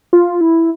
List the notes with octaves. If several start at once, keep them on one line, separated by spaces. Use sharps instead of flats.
F4
E4